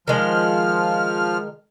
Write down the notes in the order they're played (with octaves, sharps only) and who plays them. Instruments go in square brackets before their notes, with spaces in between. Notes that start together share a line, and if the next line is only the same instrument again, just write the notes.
[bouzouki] D#3 G#3 [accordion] F3 F6